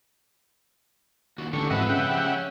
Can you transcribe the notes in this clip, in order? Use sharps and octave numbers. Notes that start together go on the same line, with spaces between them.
D#2 F#4
A1 D3 G4 A4 C#6
F2 G#2 B4 D#5 E5 F#5
C#3 E5 F#5 G5
F3 G4
C#4